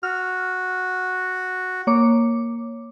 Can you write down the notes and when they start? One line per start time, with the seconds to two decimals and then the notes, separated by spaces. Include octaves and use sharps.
0.03 F#4 F6
1.87 A#3 C#5 D6